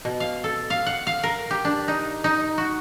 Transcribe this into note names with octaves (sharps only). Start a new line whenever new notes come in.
B2
F5
A4
F5
F#5
F5
A#4
G4
D4
D#4
D#4
F#4